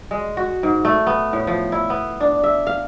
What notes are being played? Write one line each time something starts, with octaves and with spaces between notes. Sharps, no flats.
G#3
F#4
G#2
A3
B3
A2
F3
E4
B3
D4
E5
F5